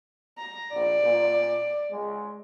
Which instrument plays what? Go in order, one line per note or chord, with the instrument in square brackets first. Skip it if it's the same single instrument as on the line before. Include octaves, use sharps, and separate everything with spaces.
[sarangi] A#5
[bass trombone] A#1 [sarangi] D5
[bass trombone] A#2
G#3